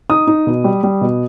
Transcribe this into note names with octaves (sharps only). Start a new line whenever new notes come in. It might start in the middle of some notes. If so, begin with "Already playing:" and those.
D#4 D#6
D#4
B2
G3
G3
B2